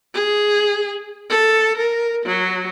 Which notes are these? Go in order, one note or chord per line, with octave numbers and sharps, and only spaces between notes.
G#4
A4
A#4
F#3